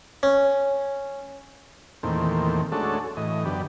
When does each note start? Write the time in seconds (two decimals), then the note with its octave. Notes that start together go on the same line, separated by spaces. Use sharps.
0.23 C#4
2.03 E2 A#2 D#3 A3 C4
2.72 G#3 A3 C#4 D4 F#4 A4
3.17 A2 E3 D#5
3.45 F#2 D3 B3 G4